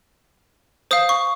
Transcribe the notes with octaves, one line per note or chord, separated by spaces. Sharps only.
C5 F5 D#6
C#6